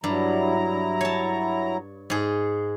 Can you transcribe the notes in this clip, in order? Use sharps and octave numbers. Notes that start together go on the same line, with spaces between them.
G2 F#3 E4 A#5
C#5 A5
G#2 G#4